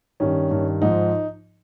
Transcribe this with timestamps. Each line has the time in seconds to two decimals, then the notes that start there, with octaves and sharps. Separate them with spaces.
0.20 G2 D#3 C#4
0.51 G2 D#3
0.82 G#2 F3 D#4